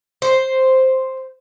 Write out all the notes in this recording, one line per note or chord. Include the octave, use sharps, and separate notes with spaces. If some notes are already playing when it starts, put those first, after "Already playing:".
C5